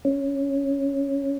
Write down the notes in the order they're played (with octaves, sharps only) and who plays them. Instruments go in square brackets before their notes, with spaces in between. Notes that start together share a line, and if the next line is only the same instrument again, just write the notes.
[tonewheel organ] C#4